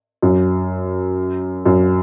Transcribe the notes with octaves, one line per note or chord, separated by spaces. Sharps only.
F#2
F#2